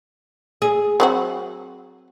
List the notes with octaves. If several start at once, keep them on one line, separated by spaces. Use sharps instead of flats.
G#4
F#3 C4 F#4